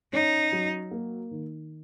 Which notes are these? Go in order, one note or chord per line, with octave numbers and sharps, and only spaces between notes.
C#4 D#4
F#3
A#3
D#3